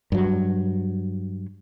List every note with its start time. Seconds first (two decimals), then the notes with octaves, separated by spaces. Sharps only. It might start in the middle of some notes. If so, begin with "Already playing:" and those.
0.12 G2 F#3